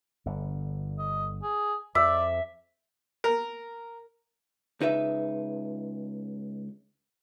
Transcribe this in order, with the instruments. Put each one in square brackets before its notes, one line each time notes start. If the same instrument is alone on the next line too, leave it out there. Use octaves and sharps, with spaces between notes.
[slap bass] G1 D3
[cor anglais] D#5
G#4
[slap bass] F2 [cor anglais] D5 [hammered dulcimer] E5
[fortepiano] A#4
[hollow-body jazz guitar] C#2 D#4 B4 E5